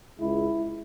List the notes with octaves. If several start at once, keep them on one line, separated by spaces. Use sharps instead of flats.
C#2 C#3 G#3 E4